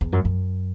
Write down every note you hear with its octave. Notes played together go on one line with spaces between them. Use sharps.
E2
F#2
F#2